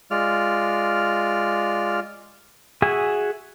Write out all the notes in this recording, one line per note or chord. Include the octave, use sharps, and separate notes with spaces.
G#3 F4 D5 F6
F#4 G#4 E5 G#5